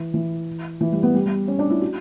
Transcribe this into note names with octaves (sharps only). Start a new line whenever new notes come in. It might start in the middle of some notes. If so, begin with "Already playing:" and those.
Already playing: E3
E3
E3
G3
B3
G3
G3
C#4
D4
E4
F#4